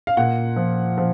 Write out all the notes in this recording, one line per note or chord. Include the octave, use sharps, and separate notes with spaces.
F5
A#2 F#5
F3
F3